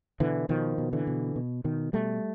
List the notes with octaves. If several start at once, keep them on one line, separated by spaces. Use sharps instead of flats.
B2 D3 E3
B2 D#3 F3
B2
D3 E3
B2
B2
B2 D#3
B2 G3 A3